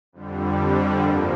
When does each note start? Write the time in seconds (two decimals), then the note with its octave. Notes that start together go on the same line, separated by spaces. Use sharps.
0.13 F2 D3 G3
1.01 G2 F3 A#3